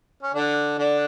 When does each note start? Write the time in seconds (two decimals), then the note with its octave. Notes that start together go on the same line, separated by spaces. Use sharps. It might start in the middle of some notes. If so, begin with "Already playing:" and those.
0.23 C#4
0.34 D3 D4
0.79 D3 D4